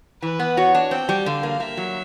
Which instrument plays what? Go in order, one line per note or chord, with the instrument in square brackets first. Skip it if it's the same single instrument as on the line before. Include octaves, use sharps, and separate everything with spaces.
[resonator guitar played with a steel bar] E3 [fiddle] B4
[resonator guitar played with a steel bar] B3
[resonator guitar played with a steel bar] F#4 [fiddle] C#5
[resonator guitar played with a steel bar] D4
[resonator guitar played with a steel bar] C4 [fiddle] G5
[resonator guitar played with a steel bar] G3
[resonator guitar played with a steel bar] D3 [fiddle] F5
[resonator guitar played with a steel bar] A#3
[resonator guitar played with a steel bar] A#3 [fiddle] E5
[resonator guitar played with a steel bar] F#3